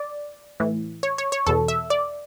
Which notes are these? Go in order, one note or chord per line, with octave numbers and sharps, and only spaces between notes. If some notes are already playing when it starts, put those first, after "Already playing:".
Already playing: D5
A2 E3
C#5
C#5
C#5
E2 B2 A4
E5
D5